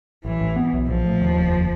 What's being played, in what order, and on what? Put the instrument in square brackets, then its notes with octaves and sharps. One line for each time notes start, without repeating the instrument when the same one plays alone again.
[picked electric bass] A1 [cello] E3
[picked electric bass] A1
B3
B1
[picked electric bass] A#1 [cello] F3
[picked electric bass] A2
D#2
F1